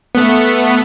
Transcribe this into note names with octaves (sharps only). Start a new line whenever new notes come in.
A3 B3